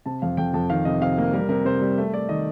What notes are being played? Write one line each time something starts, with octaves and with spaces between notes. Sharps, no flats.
C3 A5
F2 F5
F2 G5
F2 A5
D#3 F5
C3 D#5
C3 F5
A#3 A#4
G3 A#4
C3 A#4
C3 C5
G3
A3
A3 D5
D#3 D#5